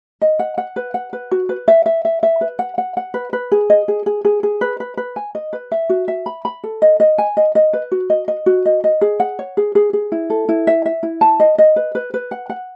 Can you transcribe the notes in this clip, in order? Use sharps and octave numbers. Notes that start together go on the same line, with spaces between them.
D#5
F#5
F#5
B4
F#5
B4
F#4
B4
E5
E5
E5
E5
B4
F#5
F#5
F#5
B4
B4
G#4
D#5
G#4
G#4
G#4
G#4
B4
B4
B4
G#5
D#5
B4
E5
F#4
E5
B5
B5
A4
D#5
D#5
G#5
D#5
D#5
B4
F#4
D#5
D#5
F#4
D#5
D#5
G#4
F#5
C#5
G#4
G#4
G#4
E4
A4
E4
E5
E5
E4
A5
D#5
D#5
B4
B4
B4
F#5
F#5